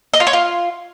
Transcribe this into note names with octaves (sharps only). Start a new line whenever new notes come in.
D#5
F4
C#5
F4